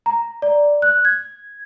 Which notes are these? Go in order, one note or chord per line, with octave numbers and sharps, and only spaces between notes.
A#5
D5
F#6
G#6